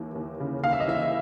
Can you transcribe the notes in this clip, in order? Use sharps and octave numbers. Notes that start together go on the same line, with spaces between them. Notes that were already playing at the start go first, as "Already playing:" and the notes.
Already playing: D#2 E3
D#2
C#3
D#2 F5
E5
D#5
E3 E5